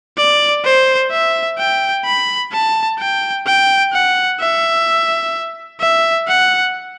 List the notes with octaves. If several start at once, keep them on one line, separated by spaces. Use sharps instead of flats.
D5
C5
E5
G5
B5
A5
G5
G5
F#5
E5
E5
F#5